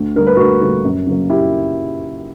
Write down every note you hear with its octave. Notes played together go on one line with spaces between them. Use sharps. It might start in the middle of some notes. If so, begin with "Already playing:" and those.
Already playing: D2
D3 G3 A#3 A#4
B4
D2 F#4 A#4
D3 G3 A#3
F#2
C#3 F#3 A#3
E4 G4